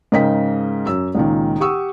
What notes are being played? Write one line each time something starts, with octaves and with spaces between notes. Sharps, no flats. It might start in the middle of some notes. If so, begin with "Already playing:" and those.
G#2 C#3 A#4 D#5 G5 B6
F#2 E6
C#2 A#2 D#3
G4 F#5 C#6 D#6 E6